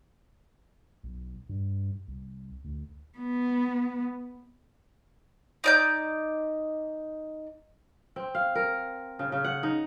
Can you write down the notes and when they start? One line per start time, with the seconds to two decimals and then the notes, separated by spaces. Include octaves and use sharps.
1.03 B1
1.49 G2
2.08 C2
2.64 D2
3.19 B3
5.64 D#4 D5 G6
8.16 C4
8.35 F5
8.55 A#4
9.19 C#3
9.32 C#3
9.44 F#5
9.63 D#4